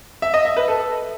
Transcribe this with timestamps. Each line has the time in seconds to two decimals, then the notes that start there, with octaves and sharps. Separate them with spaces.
0.22 E5
0.34 D#5
0.45 E5
0.57 B4
0.68 A4